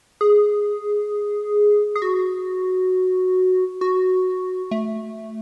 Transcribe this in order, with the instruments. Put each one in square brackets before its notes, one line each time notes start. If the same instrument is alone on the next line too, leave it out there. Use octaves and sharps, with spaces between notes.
[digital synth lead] G#4
G#4
F#4
F#4
A3